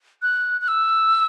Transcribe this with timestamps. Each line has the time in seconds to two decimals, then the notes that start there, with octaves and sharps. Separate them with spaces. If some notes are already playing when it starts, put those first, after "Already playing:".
0.22 F#6
0.61 F#6
0.68 E6